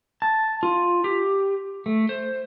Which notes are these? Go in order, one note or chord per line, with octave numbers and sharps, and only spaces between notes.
A5
F4
G4
A3
C5